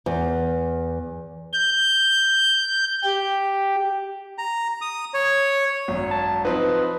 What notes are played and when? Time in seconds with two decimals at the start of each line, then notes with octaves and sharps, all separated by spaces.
0.06 E2
1.53 G6
3.04 G4
4.38 A#5
4.81 D#6
5.14 C#5
5.88 G#1 F#2
6.11 A5
6.45 F3 C4 D#4 B4